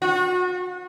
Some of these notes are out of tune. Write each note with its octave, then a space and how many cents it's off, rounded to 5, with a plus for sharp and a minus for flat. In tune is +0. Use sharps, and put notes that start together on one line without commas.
F#4 -35